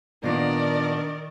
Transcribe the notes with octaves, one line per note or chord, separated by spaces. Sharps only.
A#2 D#3 A#3 B3 D4 A#4 D5